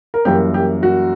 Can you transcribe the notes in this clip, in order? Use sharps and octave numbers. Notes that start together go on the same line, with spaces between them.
A#4
F#2 E3 G3 A#3 G4
G4
F#4